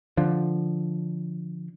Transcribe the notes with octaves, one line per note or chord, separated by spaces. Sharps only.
D3 F3